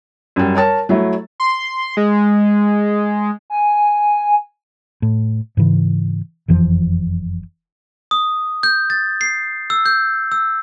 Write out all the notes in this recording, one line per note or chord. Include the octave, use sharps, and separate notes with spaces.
F#2 G3
A#4 C#5 A5
F#3 A3 E4
C6
G#3
G#5
A2
G#2 C#3 E3
F#1 F2 E3 F3
D#6
G6
A6
C7
E6
G6
E6